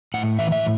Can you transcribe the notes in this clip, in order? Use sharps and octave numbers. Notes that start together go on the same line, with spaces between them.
A2 F#5
E3 E5
E5